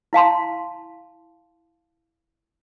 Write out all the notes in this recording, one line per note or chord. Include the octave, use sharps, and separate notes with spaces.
E4 F5 A5 C6